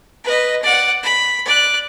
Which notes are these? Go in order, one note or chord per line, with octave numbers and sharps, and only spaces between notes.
B4 D#5
D5 F#5
B5
D5 F#6